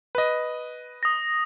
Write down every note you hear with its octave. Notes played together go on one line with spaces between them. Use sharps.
B4 D#5
D#6 A#6